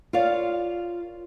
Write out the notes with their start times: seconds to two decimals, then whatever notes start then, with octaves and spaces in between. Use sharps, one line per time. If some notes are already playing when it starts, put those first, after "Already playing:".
0.13 F4 A#4 C#5 D5 F5